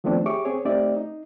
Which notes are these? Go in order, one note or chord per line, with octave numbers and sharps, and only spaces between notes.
D#3 F3 A3 B3 C4 D4
G4 G#4 C#5 E5 C#6 D6
C4 G#4 C#5
A3 C4 D#4 G4 D5 E5
D#4